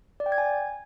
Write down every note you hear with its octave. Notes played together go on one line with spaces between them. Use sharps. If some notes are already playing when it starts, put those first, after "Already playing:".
D5
G5
G#6
G#5